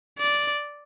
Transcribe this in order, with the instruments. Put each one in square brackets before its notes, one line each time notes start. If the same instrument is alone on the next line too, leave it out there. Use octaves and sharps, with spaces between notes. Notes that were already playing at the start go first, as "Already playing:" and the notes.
[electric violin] D5